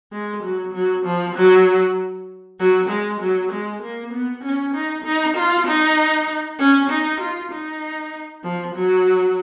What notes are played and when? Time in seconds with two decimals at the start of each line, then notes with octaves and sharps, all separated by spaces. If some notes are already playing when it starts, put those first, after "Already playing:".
0.12 G#3
0.43 F#3
0.74 F#3
1.05 F3
1.35 F#3
2.59 F#3
2.89 G#3
3.20 F#3
3.52 G#3
3.82 A#3
4.13 B3
4.43 C#4
4.74 D#4
5.04 D#4
5.36 F4
5.67 D#4
6.59 C#4
6.90 D#4
7.20 F4
7.52 D#4
8.43 F3
8.74 F#3